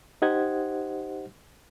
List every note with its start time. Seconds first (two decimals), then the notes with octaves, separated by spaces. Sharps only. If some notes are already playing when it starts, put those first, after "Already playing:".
0.22 D#4 G4 C5 D#5 F#5 G#6